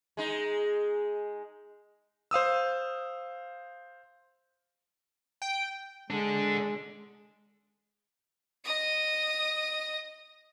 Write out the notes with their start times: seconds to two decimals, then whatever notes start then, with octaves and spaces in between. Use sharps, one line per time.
0.17 G#3 D#4
2.31 C5 F5 D#6 E6
5.42 G5
6.10 G#3 D4 A4
8.64 D#5 D#6